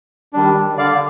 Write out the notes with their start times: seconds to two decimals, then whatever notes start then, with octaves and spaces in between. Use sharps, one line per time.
0.33 D#3 G3 D4
0.78 D3 D5 F5